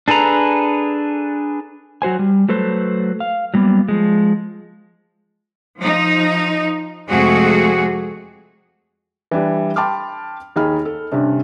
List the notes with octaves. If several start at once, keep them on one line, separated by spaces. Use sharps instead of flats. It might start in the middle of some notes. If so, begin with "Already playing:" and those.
D4 G#4 A4 B4 A#5
F#3 F#4 C5 G#5
G3
F#3 A3 A4 B4 C5
F5
F#3 G3 A#3 B3
F3 G#3
F3 D#4
F2 C3 G#3 A3 F#4 G#4
E3 G3 D4 G4
G5 A5 B5 C6 D6 F6
D#2 D#4 G#4 A#5 B5 F6
A4
G2 C3 C#4 D4